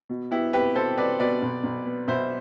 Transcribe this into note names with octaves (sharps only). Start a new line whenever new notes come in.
B2
B3 E4 G4
C2 G4 B4
B2 A4 C5
C2 B4 D5
B2 B4 D5
B1
B1
B3
B1 C5 E5